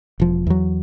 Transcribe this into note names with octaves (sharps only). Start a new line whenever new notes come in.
E1 F3
E2 F#3